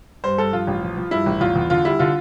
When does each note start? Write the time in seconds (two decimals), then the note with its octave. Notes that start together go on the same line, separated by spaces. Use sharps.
0.24 G2 C5
0.38 G2 A4
0.53 F3 F4
0.67 A1
0.82 F3
0.97 F3
1.11 G2 E4
1.26 A1
1.41 E2 F4
1.56 E2
1.70 D3 F4
1.85 G3 E4
1.99 D3 F4